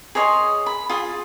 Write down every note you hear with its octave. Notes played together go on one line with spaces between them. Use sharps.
G#4 C#5 D#5 C6
B5
F4 G#4